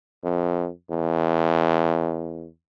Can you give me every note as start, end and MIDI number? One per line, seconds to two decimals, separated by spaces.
0.24 0.69 41
0.90 2.46 40